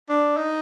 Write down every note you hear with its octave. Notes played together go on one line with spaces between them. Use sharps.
D4
D#4